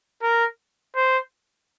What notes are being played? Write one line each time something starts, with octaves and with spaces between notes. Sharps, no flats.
A#4
C5